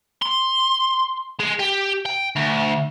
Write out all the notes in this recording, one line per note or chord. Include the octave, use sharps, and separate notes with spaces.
C6
G#3
G4
G5
D2